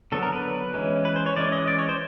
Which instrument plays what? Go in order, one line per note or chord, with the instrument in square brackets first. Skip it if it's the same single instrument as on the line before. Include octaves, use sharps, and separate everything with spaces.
[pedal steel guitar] D3 F#3 B3 A4
A#4
B4
E3 G#3 C#4
B4
C5
C#5
E3 G#3 C#4 D5
D#5
D5
C#5
C5